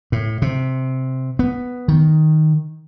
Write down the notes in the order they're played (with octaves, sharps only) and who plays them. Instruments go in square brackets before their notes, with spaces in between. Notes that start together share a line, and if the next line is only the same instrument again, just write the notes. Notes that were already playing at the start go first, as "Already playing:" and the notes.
[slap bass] A2
C3
B3
D#3